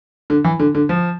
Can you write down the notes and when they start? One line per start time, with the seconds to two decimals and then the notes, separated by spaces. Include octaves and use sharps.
0.30 D3
0.44 E3
0.60 D3
0.75 D3
0.89 F3